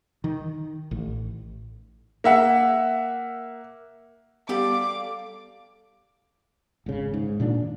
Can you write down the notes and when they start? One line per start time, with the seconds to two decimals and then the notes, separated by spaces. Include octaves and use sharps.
0.24 D#3
0.91 A1
2.24 A#3 E5 F#5
4.49 G3 B3 G4 A4 F5 B5 D6
6.86 G#1 C#3
7.14 G#2
7.40 A#2 D#3 D4